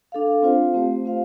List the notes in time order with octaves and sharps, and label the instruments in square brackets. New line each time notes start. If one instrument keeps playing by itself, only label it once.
[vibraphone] D4 A4 F5
C4 F4 C5 F5
A3 C4 G4 C5
C4 F4 C5 F5